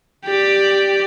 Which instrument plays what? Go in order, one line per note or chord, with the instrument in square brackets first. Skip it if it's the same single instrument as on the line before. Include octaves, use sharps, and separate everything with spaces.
[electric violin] G4 D5